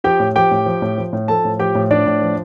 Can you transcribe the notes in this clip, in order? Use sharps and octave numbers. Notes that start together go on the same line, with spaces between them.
F3 G4 G5
A2
F3 G4 G5
A2
F3
A2
F3
A2
F3 A4 A5
A2
F3 G4 G5
A2
F3 D4 D5
A2
F3